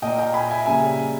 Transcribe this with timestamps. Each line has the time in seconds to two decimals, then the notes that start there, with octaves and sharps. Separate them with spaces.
0.02 A#2 A#3 D#5 G5
0.19 G5 A#5
0.34 G#5 B5
0.51 E5 G#5
0.66 C#3 G3 A#3 E5 G#5